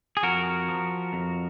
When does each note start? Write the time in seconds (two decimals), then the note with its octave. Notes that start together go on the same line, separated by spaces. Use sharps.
0.17 G#4
0.23 F2 F#4 A#4
0.68 F3
1.13 F2